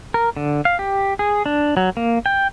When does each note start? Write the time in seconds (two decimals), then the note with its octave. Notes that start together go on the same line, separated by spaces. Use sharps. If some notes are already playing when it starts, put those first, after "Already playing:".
0.14 A#4
0.37 D3
0.65 F5
0.79 G4
1.19 G#4
1.46 D4
1.77 F#3
1.97 A#3
2.26 G5